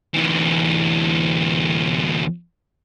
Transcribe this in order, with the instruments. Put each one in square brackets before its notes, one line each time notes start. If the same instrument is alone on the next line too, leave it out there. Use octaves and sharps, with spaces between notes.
[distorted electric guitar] D2 E3